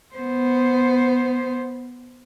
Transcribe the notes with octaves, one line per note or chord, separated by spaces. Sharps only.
B3 C5